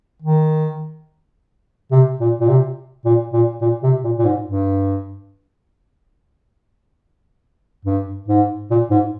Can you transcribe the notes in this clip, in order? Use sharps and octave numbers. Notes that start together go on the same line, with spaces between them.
D#3
C3
A#2
A#2
C3
A#2
A#2
A#2
C3
A#2
A#2
G#2
G2
G2
G#2
A#2
G#2